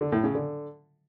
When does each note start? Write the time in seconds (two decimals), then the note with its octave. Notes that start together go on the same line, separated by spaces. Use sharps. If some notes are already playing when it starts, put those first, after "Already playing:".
0.01 D3
0.12 A2
0.23 C#3
0.35 D3